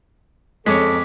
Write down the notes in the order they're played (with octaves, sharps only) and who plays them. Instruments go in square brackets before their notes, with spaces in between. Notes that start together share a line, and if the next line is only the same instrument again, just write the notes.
[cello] F2 [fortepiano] G#3 C#5 [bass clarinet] A4 [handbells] D6 B6